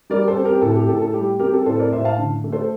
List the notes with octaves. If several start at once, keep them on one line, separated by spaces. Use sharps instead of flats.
G3 A#4 D5
A4 C5
C4
G4 A#4
A2 A4
G4
A2 A4
A4
G3 G4
C4 G4 A#4
A4
A2 A4 C5
A#4 D5
A2 C5 E5
F5 A5
D3
A3
A4 C5